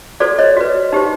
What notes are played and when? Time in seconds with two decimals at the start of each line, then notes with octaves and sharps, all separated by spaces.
0.20 F#4 A4 C5 D5
0.39 C#5 D#5
0.57 F#4 B4
0.92 D#4 G4 C5